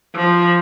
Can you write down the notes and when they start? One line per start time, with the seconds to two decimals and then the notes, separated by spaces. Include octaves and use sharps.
0.15 F3